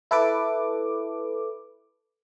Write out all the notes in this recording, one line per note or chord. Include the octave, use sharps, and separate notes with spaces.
E4 A4 B4 D6